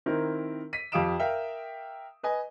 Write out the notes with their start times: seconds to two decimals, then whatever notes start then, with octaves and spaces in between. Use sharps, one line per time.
0.06 D#3 C4 E4 A#4
0.73 B6 D#7
0.92 F2 G4 F5 D#6 D7 E7
1.19 A#4 E5 F5 G5
2.23 B4 D#5 G#5